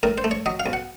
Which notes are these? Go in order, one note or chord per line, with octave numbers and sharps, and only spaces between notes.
A2 A#4
C5
A3
C#5
F#3 D#5
F5
B1
F#5